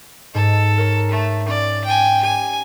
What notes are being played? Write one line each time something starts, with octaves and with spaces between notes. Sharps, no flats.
G#2 A4
A#4 C#5 A#5
A3
C#4 D5
G5 G#5
G4 G#5